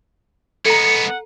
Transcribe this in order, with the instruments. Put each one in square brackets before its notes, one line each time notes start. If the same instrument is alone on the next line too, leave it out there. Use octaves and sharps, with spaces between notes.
[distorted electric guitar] G#3 B3 [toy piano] A4 A#5 [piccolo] C#7
[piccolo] F#5